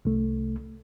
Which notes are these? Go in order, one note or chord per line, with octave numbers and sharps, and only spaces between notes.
C2 A3